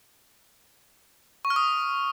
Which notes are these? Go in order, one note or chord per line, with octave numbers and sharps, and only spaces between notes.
C#6
F6
D#6